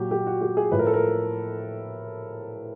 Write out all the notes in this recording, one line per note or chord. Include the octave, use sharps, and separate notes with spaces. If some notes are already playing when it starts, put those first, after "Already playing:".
Already playing: A#2 F#3 F#4 G4
G4
F#4
G4
G#4
A2 F3 B4
A#4
A4
A#4